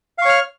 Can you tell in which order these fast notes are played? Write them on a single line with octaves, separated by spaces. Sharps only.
F5 C#6 C#5 F6